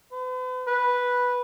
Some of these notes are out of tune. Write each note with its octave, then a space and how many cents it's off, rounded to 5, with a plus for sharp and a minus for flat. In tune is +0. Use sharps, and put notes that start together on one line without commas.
B4 +45
B4 -5